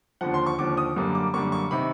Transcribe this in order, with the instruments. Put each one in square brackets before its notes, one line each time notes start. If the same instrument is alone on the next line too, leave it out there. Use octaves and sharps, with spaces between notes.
[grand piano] D#2 D3 F3 F#5
C6
C#6
D#2 D3 F3 D6
D#6
F#2 D3 G3 A#3
D6
F#2 D3 G3 A#3 C#6
C#6
C3 D#3 B5